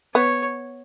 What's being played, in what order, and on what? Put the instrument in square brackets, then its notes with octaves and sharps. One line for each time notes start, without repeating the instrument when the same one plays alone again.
[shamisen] B3 [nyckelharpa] C#5